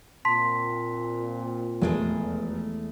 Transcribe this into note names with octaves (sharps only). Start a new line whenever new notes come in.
A#2 C4 A5 C6 B6
F1 E2 G#3 A3